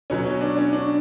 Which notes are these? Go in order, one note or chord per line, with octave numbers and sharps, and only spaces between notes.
B2 F#3 C#4
C#4
D4
C#4
D4